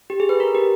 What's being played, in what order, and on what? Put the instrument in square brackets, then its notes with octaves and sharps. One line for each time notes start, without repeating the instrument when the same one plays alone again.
[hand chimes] G4
G#4
B4
A#4
G4